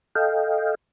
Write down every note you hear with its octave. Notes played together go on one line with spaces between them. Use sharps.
A4 D#5 F5 G5